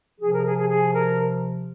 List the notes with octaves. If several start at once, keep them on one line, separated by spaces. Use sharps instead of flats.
C3 F3 G#4
A#4
G#4
G#4
G#4
A#4